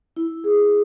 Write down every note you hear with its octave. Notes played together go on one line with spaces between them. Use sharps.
E4
G#4